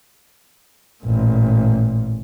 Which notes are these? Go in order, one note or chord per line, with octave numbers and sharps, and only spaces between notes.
A1 A#2